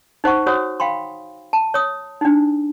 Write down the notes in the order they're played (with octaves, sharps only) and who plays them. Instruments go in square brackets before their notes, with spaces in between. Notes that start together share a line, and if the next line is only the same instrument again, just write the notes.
[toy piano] D#4 C5 F#5 C#6
F#4 C5 C#5 F#5 D#6
F5 G5 B5 C6
A5
C#5 D#6
D4 D#4